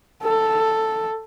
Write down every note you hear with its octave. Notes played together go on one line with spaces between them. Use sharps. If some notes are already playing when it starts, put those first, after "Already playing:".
A4